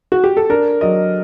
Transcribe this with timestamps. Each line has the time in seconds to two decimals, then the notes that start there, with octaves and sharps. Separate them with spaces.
0.12 F#4
0.24 G4
0.37 A4
0.49 D4 A#4
0.81 F#3 D#5